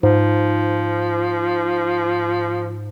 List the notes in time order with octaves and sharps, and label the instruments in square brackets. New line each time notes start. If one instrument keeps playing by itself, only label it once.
[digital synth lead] G#2 [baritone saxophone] F3